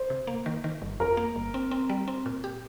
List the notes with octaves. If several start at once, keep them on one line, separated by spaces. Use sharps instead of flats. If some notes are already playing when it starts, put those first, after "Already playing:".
Already playing: C5
C3
A#3
D#3
D#3
G1
F2 A#4
A#3
G1
C4
C4
G3
C4
A#2
G4